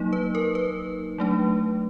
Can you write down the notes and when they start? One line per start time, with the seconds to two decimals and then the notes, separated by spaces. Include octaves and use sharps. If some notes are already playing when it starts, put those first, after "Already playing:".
Already playing: F#3 A#3 D#4
0.13 B4
0.35 A#4
0.55 B4
1.18 F#3 A3 D4